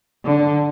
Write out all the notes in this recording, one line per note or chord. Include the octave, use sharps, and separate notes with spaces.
D3